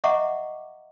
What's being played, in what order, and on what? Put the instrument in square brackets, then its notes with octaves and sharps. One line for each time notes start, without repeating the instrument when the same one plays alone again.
[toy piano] D#5 E5 F#5 A#5 C#6 D6